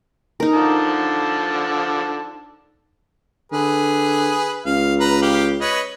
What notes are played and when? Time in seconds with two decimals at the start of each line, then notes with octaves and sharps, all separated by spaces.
0.40 D#4 A#4
0.54 D3 F3 A5
3.52 D3 G#4 B4
4.66 C#2 F5
5.00 B4 A#5
5.22 G4 F5
5.61 B4 C#5 D#5